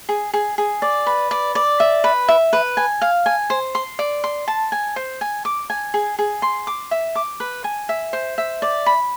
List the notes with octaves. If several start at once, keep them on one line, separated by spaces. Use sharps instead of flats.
G#4
G#4
G#4
D5
B4
D5
D5
E5
B4
E5
B4
G#5
F5
G#5
C5
C6
D5
C6
A5
G#5
C5
G#5
D6
G#5
G#4
G#4
C6
D6
E5
D6
B4
G#5
E5
C5
E5
D5
B5